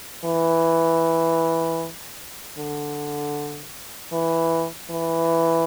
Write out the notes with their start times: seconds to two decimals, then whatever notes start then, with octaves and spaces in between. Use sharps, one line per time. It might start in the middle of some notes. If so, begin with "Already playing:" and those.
0.25 E3
2.58 D3
4.12 E3
4.90 E3